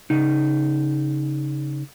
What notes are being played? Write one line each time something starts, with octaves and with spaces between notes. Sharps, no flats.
C#3 D#4